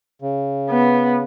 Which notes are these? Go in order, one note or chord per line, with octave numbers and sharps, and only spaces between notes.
C#3
B3